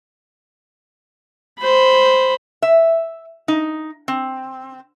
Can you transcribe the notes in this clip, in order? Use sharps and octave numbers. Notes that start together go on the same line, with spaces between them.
C5 B5
E5
D#4
C4